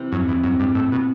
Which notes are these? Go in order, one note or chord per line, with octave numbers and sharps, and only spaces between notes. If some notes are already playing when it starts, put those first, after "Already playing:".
Already playing: C3 E3
F#2
E2
F#2
G2
A2
B2